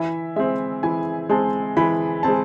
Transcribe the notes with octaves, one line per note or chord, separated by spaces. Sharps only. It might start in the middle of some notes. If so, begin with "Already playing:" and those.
Already playing: E3 E5
G#3 C4 E5
E3 G#5
G#3 C4 A5
E3 B5
G#3 C4 A5